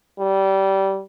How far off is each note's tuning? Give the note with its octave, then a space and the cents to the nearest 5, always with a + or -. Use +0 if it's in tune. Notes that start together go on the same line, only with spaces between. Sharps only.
G3 -20